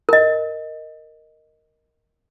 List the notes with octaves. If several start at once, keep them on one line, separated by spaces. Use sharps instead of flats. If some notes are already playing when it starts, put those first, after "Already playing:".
A#4 D#5